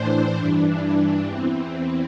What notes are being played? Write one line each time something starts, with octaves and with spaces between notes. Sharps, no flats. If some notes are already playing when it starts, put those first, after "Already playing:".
Already playing: A2 E3 D4 C5
G2 E3
E2 E3 C4